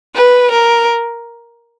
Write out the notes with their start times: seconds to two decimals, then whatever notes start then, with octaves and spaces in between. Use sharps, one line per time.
0.15 B4
0.51 A#4